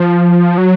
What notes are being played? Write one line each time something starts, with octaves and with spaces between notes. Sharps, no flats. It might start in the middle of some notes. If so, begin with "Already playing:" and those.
Already playing: F3
F#3